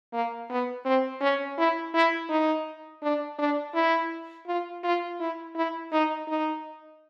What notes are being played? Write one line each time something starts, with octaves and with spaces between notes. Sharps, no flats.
A#3
B3
C4
C#4
E4
E4
D#4
D4
D4
E4
F4
F4
E4
E4
D#4
D#4